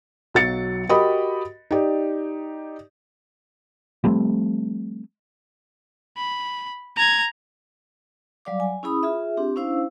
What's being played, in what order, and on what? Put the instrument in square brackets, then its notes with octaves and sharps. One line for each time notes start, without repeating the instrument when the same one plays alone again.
[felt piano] B1 F#3 A6 C#7
F#4 G4 A#4 D#5 B5 D#6
D#4 G4 D5
[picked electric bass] F3 G3 A3 C4
[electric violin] B5
A#5 G#6
[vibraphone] F#3 G3 D5 F5 D6
G#5
C#4 E4 G#4 B5 D#6
F4 G#4 E5
C4 D4 G4
C#4 D4 E4 C5 F5 E6